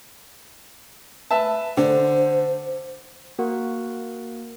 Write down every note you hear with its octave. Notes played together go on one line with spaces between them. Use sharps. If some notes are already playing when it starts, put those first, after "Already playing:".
B4 E5 A5
D3 C5
A#3 F#4 A#4 F#5